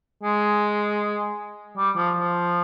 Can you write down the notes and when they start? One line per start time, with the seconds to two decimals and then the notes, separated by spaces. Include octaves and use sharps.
0.23 G#3
1.77 G3
1.96 F3
2.16 F3